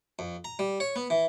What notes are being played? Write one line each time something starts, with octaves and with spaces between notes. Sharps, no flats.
F2
A#5
G3
C#5
B3
E3